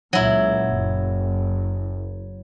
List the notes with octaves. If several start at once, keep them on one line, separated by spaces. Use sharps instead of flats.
C#2 A#2 F#3 E4
F#1